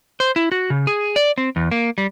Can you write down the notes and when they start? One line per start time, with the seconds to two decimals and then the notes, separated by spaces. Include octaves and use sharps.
0.20 C5
0.36 E4
0.52 F#4
0.70 C#3
0.87 G#4
1.16 D5
1.38 C4
1.56 E2
1.71 A#3
1.98 G3